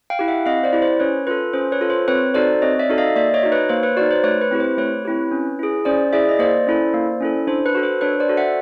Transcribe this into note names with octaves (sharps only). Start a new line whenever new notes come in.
F5 G5
E4 G4
E5 F#5
C4 D#5 F5
C5 D5
E4 G4
C5
C#4 B4 C#5
F4 A4 B4
C#4 C5
B4 C#5
F4 A4
C5
C4 B4 C#5
D#4 F#4 A4 C5 D5
C4 C#5 D#5
D5 E5
D#4 F#4 A4
D#5 F5
A#3 D5 E5
C#5 D#5
D#4 F#4
B4 C#5
A#3 C5
B4 C#5
D#4 F#4 C5 D5
C5
A3 B4 C#5
B4
C4 E4 G4
C5
A3 B4 C#5
C4 E4 G4
C#4
E4 G#4
C#4 C5 D5
E4 G#4 D5 E5
D#5
A#3 C5 D5
C#4 E4 A4
A#3
C#4 E4 A4
D4 C5
B4
F#4 A4
C5
D4 B4 C#5
C5 D5
F#4 A4
E5 F#5